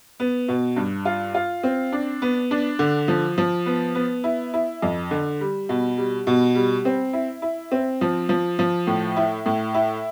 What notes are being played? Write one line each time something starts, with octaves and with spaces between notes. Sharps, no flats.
B3
B2
G2
F4
F4
C4
D4
B3
D4
D3
F3
F3
B3
B3
E4
E4
F2
D3
G3
B2
G3
B2
G3
C4
E4
E4
C4
F3
F3
F3
A2
E4
A2
E4